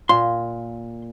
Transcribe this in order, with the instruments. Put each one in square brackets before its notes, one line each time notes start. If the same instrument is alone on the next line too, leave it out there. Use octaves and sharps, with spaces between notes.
[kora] A#2 [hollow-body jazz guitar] C6